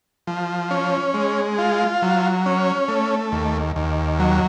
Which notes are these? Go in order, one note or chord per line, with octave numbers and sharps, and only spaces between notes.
F3
C#4
G#3
F4
F#3
C#4
A3
D#2
D#2
F#3